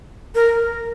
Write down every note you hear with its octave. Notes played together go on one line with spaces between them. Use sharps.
A#4